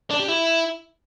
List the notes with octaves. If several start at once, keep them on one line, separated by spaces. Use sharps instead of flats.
D4
G4
E4